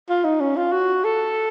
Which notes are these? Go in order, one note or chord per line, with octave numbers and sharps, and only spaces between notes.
F4
D#4
C#4
F4
F#4
A4